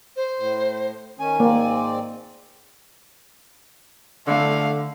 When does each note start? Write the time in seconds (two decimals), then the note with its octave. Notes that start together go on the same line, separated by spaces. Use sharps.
0.16 C5
0.39 A2
1.19 D#3 C#4 G#5
1.40 G#2 A#3 C4 D5
4.27 D3 A3 F5